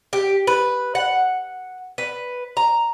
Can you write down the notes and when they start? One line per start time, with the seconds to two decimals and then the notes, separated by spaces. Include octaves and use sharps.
0.13 G4
0.47 B4
0.95 F#5
1.98 B4
2.57 A#5